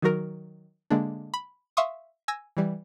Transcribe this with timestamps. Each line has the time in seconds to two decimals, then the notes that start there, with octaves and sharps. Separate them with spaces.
0.02 D#3 F#3 F#4 A#4
0.90 D3 G#3 A#3 D4
1.34 B5
1.77 E5 F5 C6 C#6 D#6
2.28 G#5 E6 G#6 A#6
2.57 E3 G3